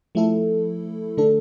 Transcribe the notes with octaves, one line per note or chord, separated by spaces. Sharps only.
F3 A3 E4 A4
D3 A3 D4 A4